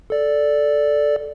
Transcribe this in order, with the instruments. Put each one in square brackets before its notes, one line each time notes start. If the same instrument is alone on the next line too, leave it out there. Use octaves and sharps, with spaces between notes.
[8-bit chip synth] A4 D5